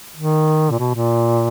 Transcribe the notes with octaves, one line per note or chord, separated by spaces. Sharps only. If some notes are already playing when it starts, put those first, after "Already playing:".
D#3
A#2
B2
A#2